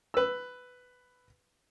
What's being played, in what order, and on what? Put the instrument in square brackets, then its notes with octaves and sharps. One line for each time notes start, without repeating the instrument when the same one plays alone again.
[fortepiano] B4 E6